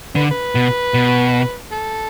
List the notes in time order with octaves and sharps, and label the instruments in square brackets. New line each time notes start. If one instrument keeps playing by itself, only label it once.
[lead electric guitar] D3 [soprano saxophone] B4
[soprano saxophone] B4
[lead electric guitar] B2
B2
[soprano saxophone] A4